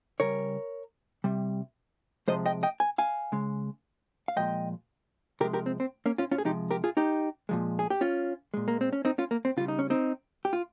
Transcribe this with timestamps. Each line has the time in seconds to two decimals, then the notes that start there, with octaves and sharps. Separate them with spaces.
0.20 C#3 G3 A#4 C#5
1.24 C3 G3
2.28 C3 F3 G#3 C5 D#5
2.46 D#5 G5
2.63 D#5 G5
2.80 G#5
2.98 F5 G#5
3.32 C#3 G#3
4.28 F5
4.36 A#2 F3 G#3 D#5 G5
5.40 C3 F3 G#3 G4 A#4
5.53 G4 A#4
5.66 C4
5.80 C4
6.06 A#3 C#4
6.18 C#4 F4
6.31 C#4 F4
6.38 G#4
6.45 C3 F3 G#3 D#4 G4
6.71 G4 A#4
6.84 F4 G#4
6.97 D#4 G4
7.49 A#2 F3 G#3
7.79 G#4
7.90 G4
8.01 C#4 F4
8.54 A#2 G#3
8.68 A#3
8.81 C4
8.93 C#4
9.05 C4 D#4
9.18 C#4 F4
9.31 A#3
9.45 C4
9.57 C#3 G3 F4
9.68 D#4
9.79 C#4
9.90 C4 D#4
10.45 G4
10.53 F4